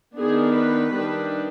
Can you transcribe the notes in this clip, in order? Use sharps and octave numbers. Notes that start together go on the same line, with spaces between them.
D#3 B3 D4 G#4
B4
D#3 G3 D4